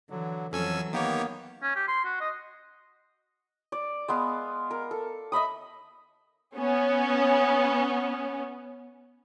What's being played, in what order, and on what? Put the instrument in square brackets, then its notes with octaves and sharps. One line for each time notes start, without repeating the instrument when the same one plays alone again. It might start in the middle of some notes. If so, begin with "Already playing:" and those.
[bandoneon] D3 F#3 [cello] E3
[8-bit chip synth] F2 G#5 E6 [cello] E3 F#3 [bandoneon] C#4 A4
[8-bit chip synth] D#3 G4 C#5 [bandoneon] A#3 B3
[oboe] C#4
G4
C6
F#4
D#5
[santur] D5
G#3 B3 F5
A#4
A4
D#5 E5 B5 D#6
[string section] B3 C#4